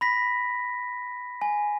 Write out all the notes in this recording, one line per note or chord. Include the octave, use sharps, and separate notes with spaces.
B5 A#6 B6
G#5